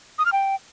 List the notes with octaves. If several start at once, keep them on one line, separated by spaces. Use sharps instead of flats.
D#6
F6
G5